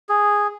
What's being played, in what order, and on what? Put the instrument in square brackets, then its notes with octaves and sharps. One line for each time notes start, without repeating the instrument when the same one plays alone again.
[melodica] G#4